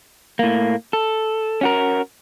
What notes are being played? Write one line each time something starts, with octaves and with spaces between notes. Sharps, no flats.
A2 A#3
A4
C#4 F#4 A#4